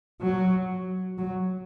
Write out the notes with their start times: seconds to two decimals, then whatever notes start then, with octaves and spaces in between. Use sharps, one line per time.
0.21 F#3
1.18 F#3